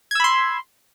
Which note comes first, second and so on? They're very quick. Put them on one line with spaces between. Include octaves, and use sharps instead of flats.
G#6 E6 B5 C6